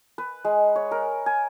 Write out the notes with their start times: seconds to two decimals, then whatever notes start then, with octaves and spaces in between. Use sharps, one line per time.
0.18 B4
0.45 G#3
0.76 C#5
0.91 A#4
1.26 G#5